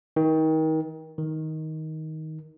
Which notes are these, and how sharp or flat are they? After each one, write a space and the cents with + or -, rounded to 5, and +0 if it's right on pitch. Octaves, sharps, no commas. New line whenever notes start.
D#3 +30
D#3 +15